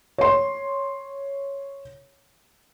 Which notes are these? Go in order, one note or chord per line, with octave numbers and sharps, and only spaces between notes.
C#5 C6